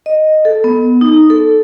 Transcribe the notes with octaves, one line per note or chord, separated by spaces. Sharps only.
D#5
A4
B3
D#4
A4